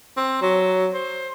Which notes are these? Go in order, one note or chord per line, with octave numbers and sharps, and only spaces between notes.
C4
F#3
C5